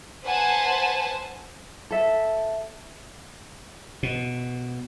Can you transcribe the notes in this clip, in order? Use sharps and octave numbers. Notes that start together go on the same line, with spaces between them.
B4 C5 F#5 G#5 A5
A4 E5
B2